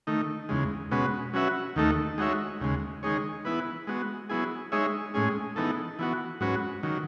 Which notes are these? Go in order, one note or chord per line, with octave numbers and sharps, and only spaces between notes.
D#3 A3 D#4
E2 C#3 G#3
B2 G#3 C#4 F#4 B4
F#3 C#4 F#4 B4 E5
D#2 D#3 A3 D#4 A4
G#3 D#4 F#4 C#5 E5
D#2 C#3 G#3
D#3 G#3 D#4 G#4 C#5
E3 B3 E4 B4
G#3 B3 F#4
F#3 B3 E4 G#4
G#3 D#4 G#4 C#5 E5
A2 G#3 C#4 G#4
E3 B3 D#4 A4
E3 B3 F#4
G#2 F#3 C#4 F#4 B4
D#3 F#3